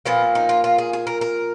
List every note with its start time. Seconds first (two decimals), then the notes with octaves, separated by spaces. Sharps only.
0.06 A#2 F3 A#3 B3
0.35 D#4
0.49 F4
0.64 F4
0.78 G#4
0.93 G#4
1.07 A#4
1.21 A#4